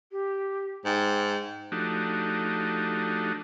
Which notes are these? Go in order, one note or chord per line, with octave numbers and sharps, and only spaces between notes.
G4
G#2 G5
F3 A3 D4 D#4 F#4 G4